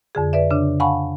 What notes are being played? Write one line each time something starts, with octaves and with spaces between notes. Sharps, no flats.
F2 D3 G#4
B4 D5 E5
C#3 D4
F5 F#5 G#5 A5 B5 C#6